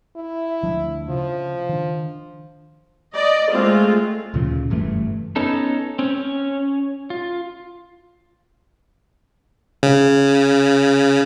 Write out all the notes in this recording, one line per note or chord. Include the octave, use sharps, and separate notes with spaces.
E4
D2 F3 D4
C#3 F3
D#3 D4
D5 D#5
G#3 A3 C4 F4
D2 A#2 C#3 F3
F#1 G2 E3 A3
B3 C#4 D#4 A4
C4 C#4
C#4
F4
C#3